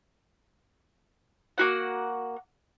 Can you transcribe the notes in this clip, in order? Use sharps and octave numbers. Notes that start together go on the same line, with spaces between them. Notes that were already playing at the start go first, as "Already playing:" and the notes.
A#3 F#4 F#5